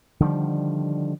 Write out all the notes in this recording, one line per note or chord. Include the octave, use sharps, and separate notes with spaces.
D3 D#3 F3 G3